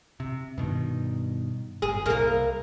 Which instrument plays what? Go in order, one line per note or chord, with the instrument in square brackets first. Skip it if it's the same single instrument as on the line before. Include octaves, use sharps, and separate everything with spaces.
[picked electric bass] C3
G2 B2 D#3
[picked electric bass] G1 [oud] G#4
[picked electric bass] C2 [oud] A#3 A#4